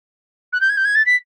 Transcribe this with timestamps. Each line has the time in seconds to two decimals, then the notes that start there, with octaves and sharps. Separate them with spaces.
0.53 F#6
0.61 G6
0.69 G#6
0.77 G6
0.85 G#6
0.95 A6
1.06 B6